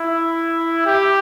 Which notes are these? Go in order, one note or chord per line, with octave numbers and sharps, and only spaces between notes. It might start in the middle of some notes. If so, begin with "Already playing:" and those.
Already playing: E4
G4